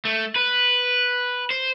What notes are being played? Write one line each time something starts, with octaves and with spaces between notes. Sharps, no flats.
A3
B4
C5